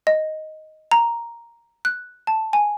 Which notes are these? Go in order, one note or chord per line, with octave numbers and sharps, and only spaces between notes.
D#5
A#5
F#6
A5
G#5